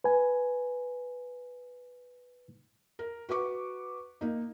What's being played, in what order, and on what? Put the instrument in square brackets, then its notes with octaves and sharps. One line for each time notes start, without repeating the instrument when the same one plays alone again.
[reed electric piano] B4 G#5
[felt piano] A#4
F#4 B4 C#6 D6
A#3 D#4